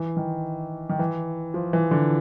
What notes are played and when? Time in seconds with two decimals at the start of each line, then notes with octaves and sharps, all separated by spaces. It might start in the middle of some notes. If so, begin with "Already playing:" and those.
Already playing: E3
0.17 D#3
0.89 D#3
0.99 E3
1.54 F3
1.73 E3
1.91 D3